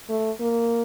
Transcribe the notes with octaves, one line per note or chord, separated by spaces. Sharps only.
A3
A#3